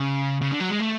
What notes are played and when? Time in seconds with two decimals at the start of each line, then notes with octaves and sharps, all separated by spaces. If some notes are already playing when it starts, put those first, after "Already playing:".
Already playing: C#3
0.41 C#3
0.52 D3
0.61 F#3
0.70 G#3
0.81 A3